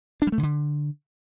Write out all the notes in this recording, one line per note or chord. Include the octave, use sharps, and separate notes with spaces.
D4
G3
A3
C#3
D3